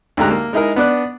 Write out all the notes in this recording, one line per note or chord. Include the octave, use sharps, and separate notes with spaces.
D2 G#2 A3 G4 A#5 F#6
A#3
G#3 D#4 E4 G#4 A#4
B3 D4 D5 F#6